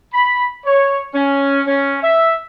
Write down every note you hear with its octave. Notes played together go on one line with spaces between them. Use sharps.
B5
C#5
C#4
C#4
E5